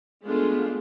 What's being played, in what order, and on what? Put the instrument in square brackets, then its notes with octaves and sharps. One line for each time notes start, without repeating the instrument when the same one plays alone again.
[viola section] G#3 A3 B3 D4 F4